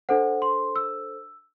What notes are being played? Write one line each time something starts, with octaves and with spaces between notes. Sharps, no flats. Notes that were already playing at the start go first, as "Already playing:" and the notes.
D4 A4 C5 F#5
C6
E6